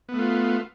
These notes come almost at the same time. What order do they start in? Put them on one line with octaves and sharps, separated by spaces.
B3 A3 F4